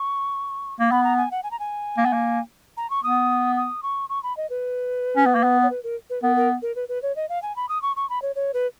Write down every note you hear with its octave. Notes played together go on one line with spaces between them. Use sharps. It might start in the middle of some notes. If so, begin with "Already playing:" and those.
Already playing: C#6
A#3
B3 B5
A#5
G#5
F#5
G#5
A#5
G#5
A#3
B3
A#3
A#5
C#6
B3 D#6
D#6
C#6
C#6
B5
D#5
B4
C#4
B3
A#3
B3
C#5
B4
A#4
B4
B3 A#4
A#4
A#4
B4
B4
C#5
D#5
F5
G#5
B5
D#6
C#6
C#6
B5
C#5
C#5
B4